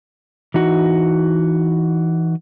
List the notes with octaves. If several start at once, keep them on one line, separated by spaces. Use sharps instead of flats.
E3 D#4 F#4